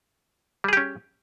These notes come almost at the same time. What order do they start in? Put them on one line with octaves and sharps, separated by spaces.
G3 G#4 G4 C#4